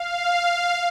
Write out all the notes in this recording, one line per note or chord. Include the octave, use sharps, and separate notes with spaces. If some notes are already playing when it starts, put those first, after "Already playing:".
Already playing: F5